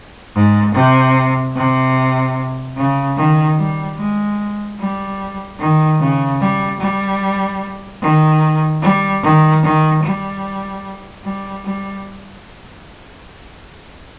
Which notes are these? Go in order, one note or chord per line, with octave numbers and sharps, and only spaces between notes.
G#2
C3
C3
C#3
D#3
G3
G#3
G3
D#3
C#3
G3
G3
D#3
G3
D#3
D#3
G3
G3
G3